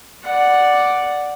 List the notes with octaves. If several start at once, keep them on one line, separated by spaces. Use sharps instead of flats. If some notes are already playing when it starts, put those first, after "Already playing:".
D5 F#5